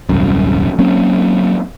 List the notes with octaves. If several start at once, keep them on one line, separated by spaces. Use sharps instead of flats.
D#1 C2 F#2
F#3 A#3 C4 C#4